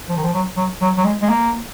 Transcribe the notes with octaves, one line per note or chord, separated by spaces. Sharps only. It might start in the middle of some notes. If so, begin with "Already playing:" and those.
F3
D#3
F3
F#3
F#3
F#3
F#3
G#3
G#3
A#3